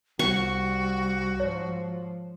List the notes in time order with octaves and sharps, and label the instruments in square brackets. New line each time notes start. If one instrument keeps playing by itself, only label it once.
[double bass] C2 G3 [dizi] F#4 [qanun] C#6
[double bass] G#2 F3 [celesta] C#5